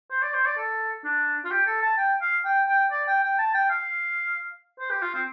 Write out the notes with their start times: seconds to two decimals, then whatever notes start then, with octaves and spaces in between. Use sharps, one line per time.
0.11 C5
0.22 D5
0.34 C5
0.45 D5
0.57 A4
1.04 D4
1.45 F4
1.51 G4
1.66 A4
1.82 A5
1.98 G5
2.21 F5
2.45 G5
2.68 G5
2.91 D5
3.08 G5
3.23 G5
3.38 A5
3.55 G5
3.69 F5
4.80 C5
4.91 G4
5.02 F4
5.14 C4